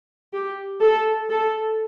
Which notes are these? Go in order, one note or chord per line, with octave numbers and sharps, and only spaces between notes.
G4
A4
A4